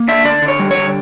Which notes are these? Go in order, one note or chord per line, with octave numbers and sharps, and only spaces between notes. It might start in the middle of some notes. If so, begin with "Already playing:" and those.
Already playing: A#3
D4 E5
D3 D5
D3
C#5
G3
C#5
D3